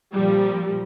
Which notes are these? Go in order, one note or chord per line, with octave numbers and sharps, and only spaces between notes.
A#2 F3 G3